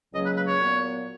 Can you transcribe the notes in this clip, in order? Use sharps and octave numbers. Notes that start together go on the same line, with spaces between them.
C#2 C#3 F#3 A#3 D#5
B4
B4
C#5
A#2 F#3 B3